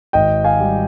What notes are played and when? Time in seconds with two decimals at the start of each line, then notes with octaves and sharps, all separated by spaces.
0.13 G#1 D#5 G5
0.44 F5 G#5
0.60 G3